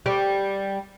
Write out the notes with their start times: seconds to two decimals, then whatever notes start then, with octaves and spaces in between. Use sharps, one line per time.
0.06 G3 D5